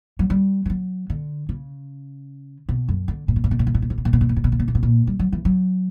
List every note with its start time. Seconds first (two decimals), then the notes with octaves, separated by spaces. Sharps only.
0.19 F#3
0.30 G3
0.66 G3
0.70 F#3
1.10 D3
1.49 C#3
2.69 B2
2.89 F#2
3.08 D3
3.28 A#2
3.36 B2
3.44 A#2
3.51 B2
3.59 A#2
3.67 B2
3.74 A#2
3.82 B2
3.90 A#2
3.98 B2
4.05 A#2
4.13 B2
4.21 A#2
4.29 B2
4.36 A#2
4.44 B2
4.52 A#2
4.59 B2
4.68 A#2
4.75 B2
4.83 A#2
5.07 G3
5.19 F#3
5.32 E3
5.45 F#3